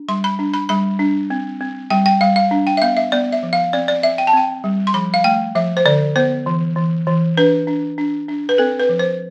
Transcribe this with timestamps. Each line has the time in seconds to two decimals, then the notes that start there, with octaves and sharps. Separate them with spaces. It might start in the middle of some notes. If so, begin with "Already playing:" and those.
Already playing: D4
0.08 G3 C6
0.24 B5
0.39 D4
0.54 B5
0.69 G3 B5
0.99 D4
1.30 C4
1.61 C4
1.90 G3 G5
2.06 G5
2.21 G3 F5
2.36 F5
2.51 D4
2.67 G5
2.77 E5
2.82 B3 F5
2.97 E5
3.12 B3 D5
3.32 E5
3.43 F3
3.53 F5
3.73 C4 D5
3.88 D5
4.03 C4 E5
4.18 G5
4.27 A5
4.33 C4 G5
4.64 G3
4.87 C6
4.94 F3 B5
5.14 F5
5.24 A3 G5
5.55 F3 E5
5.77 C5
5.85 D3 D5
6.16 B3 C5
6.46 E3
6.76 E3
7.07 E3
7.37 D4 B4
7.67 D4
7.98 D4
8.28 D4
8.49 B4
8.58 C4 A4
8.79 B4
8.89 F3
8.99 C5